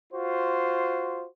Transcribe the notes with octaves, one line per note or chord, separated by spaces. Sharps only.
F4 F#4 C5